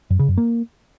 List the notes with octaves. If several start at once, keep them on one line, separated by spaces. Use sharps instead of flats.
F#2
C#3
F#2
A#3